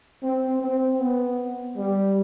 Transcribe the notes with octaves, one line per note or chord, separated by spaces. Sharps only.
C4
C4
B3
G3